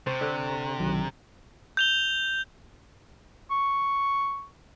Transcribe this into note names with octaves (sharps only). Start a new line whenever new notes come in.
C3 C5 C#6 A6
D3
B1 D#3 F#3
G6 F7 G7
C#6